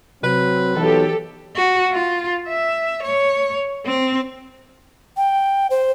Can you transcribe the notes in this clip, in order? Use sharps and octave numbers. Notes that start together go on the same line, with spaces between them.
C3 F#3 C4 B4
B1 E3 G4 A4
F#4
F4
E5
C#5
C4
G5
C5